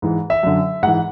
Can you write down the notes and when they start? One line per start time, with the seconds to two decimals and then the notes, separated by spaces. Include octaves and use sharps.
0.02 G#2 E3
0.30 E5
0.43 F#2 D3
0.83 G#2 E3 F#5